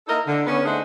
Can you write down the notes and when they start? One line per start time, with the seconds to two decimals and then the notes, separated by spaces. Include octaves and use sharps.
0.07 A#3 D#4 E4 A4 A#4 D#5
0.27 D3
0.47 B3 C#4
0.65 A3 D4 D#4 G#4 C5 F#5